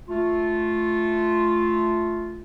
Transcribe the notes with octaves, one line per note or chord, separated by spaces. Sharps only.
A3 F4